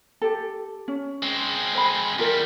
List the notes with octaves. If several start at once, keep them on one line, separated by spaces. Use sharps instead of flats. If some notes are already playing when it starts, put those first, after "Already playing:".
G4 A4
C#4
G#3 C4
C5 B5
E2 G3 F4 A#4